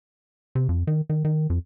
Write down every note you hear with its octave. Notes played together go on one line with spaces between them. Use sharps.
C3
F2
D#3
D#3
D#3
F2